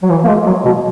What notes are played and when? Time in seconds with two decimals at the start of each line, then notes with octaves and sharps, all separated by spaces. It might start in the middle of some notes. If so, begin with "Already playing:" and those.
0.03 F#3
0.10 E3
0.24 A#3
0.28 G#3
0.46 F#3
0.65 B2